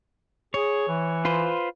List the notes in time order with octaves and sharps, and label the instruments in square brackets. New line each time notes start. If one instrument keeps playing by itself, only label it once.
[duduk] G#4 [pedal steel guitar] C#5
[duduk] E3
[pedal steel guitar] F4 B4 C5